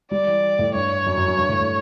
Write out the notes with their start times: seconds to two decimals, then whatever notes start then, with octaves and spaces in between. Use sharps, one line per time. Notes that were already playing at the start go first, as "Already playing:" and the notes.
0.11 G3 D5
0.27 E3
0.59 A2
0.75 G2 C#5
1.06 F#2
1.17 F#2
1.28 F#2
1.38 G2
1.49 A2
1.60 A2